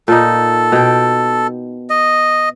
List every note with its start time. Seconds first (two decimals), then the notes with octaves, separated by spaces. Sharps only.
0.08 A#2 D#4 A4
0.72 B2 G5
1.90 D#5